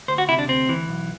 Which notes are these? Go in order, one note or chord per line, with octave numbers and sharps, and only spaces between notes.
D2 C5
F#4
C3 E4
D4
D2 C4
E3
B1